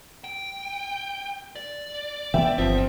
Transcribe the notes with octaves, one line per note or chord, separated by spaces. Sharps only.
G5
D5
E3 B3 E5 G5
G1 F3 C4 E5